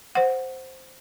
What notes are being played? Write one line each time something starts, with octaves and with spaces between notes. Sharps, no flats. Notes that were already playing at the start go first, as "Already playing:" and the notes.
C5 F#5